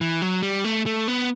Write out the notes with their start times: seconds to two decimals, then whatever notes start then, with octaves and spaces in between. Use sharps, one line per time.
0.01 E3
0.22 F#3
0.43 G3
0.64 A3
0.86 A3
1.08 B3